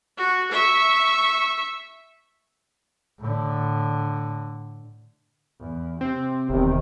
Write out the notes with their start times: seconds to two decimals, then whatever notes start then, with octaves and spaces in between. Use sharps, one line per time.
0.17 F#4
0.51 E5 C#6
3.21 A2 D3
5.60 E2
6.01 C3 C4
6.49 E1 E2 C3 D#3